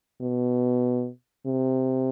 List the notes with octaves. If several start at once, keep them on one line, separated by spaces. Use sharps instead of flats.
B2
C3